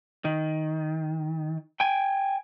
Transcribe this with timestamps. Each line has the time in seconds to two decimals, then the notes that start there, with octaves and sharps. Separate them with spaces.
0.25 D#3
1.80 G5 G#5